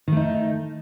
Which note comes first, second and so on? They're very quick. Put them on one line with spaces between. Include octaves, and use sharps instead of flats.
D#3 A3 D#4